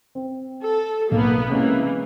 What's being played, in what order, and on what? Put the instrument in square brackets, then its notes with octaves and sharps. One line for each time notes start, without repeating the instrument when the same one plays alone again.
[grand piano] C4
[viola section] A4
[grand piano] B1 [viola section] A#3 B3
[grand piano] C3 G#3 C#4 [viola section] E3 A#3